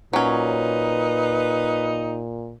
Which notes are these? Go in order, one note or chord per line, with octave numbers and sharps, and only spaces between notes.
A#2 F#3 C#4 D#4 B4